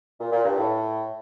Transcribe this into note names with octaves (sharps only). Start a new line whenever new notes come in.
A#2
A#2
G2
A2